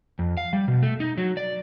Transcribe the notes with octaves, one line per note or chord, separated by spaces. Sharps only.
F2
F5
G3
B2
A3
D#4
F#3
D5